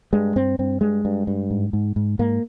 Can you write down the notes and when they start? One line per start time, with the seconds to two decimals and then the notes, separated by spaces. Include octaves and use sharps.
0.13 G2 G#3
0.36 G2 C4
0.59 G2 C4
0.81 G2 G#3
1.05 G2
1.27 G2
1.51 G#2
1.73 G#2
1.96 G#2
2.19 G#2 A#3